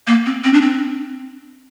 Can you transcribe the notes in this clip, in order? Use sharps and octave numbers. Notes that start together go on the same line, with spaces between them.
A#3
C4
C4
D4
C4